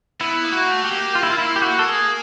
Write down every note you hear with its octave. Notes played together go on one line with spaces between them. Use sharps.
B3 E4
A#3
F#4
A3
G4
A#3
F4
E4
F4
E4
G4
F#4
A4
G#4